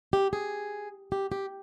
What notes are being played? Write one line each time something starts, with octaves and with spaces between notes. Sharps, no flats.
G4
G#4
G4
G4